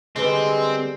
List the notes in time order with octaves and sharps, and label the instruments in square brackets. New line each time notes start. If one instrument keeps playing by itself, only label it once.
[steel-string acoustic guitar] D3 G3 B4 [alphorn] G#3 [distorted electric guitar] C4